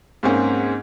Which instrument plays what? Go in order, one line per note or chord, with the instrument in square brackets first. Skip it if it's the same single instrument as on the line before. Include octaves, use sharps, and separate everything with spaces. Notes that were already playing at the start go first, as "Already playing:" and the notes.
[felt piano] G#2 A#3 C4 C#4 G#4